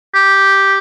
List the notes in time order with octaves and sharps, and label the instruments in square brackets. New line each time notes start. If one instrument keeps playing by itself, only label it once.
[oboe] G4